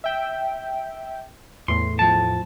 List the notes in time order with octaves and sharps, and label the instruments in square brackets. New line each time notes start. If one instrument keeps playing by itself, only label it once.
[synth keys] E5 G5
[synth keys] E2 A2 [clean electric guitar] C6
[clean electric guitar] F3 A5